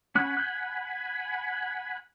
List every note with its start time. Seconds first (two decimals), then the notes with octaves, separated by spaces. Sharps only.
0.15 C#4 F#5 G#5 B5 F#6
0.37 F#6 G6